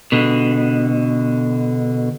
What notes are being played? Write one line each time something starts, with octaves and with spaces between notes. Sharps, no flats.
B2 D3